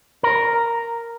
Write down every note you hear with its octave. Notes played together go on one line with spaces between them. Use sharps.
A#4